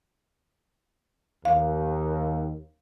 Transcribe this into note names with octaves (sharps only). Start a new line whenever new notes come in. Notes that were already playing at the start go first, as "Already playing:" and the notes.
D#2 F5